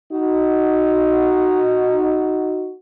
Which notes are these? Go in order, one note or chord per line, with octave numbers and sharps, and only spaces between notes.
D#4 F#4